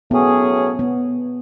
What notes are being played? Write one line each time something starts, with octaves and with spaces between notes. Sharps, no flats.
A2 F#3 B3 C#4 G#4
B3